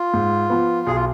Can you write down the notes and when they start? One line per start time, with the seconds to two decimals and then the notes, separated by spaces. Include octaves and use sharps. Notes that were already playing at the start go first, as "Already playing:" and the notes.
Already playing: F4
0.14 G#2
0.50 F3 B3
0.87 B1 G#4
0.96 F4